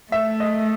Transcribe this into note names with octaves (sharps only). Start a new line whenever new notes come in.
A3 E5
D#5